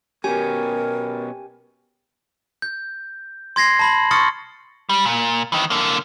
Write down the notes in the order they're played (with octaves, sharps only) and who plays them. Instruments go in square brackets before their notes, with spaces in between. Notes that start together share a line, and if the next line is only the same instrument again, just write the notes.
[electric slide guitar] B2 C#4 [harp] G4 [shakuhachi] A#4 [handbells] G#5
[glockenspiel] G6
C6 G#6 A#6 C7
A5 B5 F#7
C6 C#6 D#6 F6 A6 C#7
[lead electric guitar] G3
A#2
D#3 E3
D3 A#3